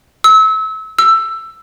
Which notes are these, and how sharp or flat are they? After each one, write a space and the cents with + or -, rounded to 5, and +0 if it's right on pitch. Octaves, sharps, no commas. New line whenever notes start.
E6 -30
E6 +10